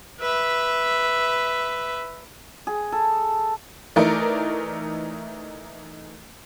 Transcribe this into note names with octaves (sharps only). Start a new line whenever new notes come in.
B4 E5
G#4
A4
E3 A3 D#4 A#4 D5